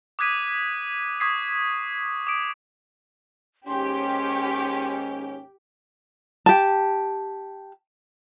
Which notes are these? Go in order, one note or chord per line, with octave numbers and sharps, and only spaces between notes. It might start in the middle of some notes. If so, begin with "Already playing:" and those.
D6 D#6 F#6 G#6 B6 D#7
C#6 D#6 G#6 B6 C7
D6 D#6 D7
D#2 G#2 C#4 G4 C6
G4 A5